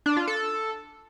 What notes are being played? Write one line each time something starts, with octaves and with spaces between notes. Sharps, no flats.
D4
F4
A4